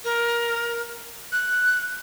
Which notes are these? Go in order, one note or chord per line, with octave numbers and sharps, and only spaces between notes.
A#4
F#6